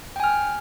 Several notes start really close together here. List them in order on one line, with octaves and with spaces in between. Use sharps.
G5 G#5 F6